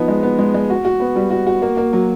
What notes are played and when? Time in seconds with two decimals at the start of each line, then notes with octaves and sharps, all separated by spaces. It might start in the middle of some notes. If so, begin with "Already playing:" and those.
Already playing: F3 B3 D#4
0.08 G#3
0.23 B3
0.39 G#3
0.54 G#3
0.70 F#4
0.85 F#4
1.00 B3
1.16 G3
1.31 F#4
1.47 F#4
1.62 A#3
1.77 A#3
1.93 F#3